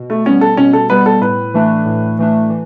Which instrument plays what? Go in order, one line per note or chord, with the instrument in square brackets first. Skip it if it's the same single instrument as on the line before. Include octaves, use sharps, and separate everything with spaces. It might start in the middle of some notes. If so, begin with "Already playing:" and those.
Already playing: [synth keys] B2
[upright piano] A3
[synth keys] G3 B3 [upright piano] C#4
[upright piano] A4
[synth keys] B2 [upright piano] C#4
[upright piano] A4
[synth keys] G3 B3 [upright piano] B4
[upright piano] A4
[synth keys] A2 [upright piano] B4
[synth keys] E3 A3 D4
A2
E3 A3 D4
E3